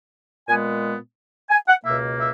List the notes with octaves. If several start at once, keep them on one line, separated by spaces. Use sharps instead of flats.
A#2 G#3 B3 G#5
G#5
F#5
C#2 B2 A#3 E5
E5